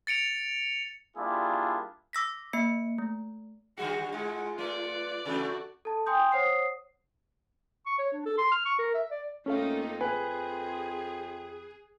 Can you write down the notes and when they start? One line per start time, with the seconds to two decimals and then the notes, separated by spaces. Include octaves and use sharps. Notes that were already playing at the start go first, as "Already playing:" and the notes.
0.07 A6 C#7 D7 F7
1.17 G3 A#3 D4 E4 F4 G#4
2.13 D6 E6 A#6 B6
2.53 A#3 E5 C#7
2.98 A3
3.78 D3 G3 F#4 G#4 F#5
4.12 G#2 G#3 F4
4.59 A3 B4 D5
5.25 C3 E3 A3 F#4 A4
5.85 A4 A5
6.06 G5 G#5 C6 D#6 G6
6.32 C5 C#5 F#5 D#6 C7
7.86 C#6
7.99 C#5
8.13 D4
8.26 A4
8.38 C6
8.52 F6
8.66 C#6
8.79 A#4
8.94 E5
9.11 D5
9.46 F2 A3 A#3 C#4 D#4 A4 F5
10.01 G#4 B4 G#5